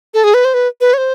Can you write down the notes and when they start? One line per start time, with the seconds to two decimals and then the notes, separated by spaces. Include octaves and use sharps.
0.14 A4
0.24 G#4
0.34 B4
0.45 C5
0.54 B4
0.81 B4
0.94 C#5
0.98 C5